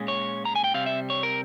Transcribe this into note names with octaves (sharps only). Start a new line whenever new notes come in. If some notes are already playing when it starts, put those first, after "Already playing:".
Already playing: A#2 G#3 C#4
C#5
A#5
G#5
G5
C3 G3 C4 F5
E5
C#5
A#4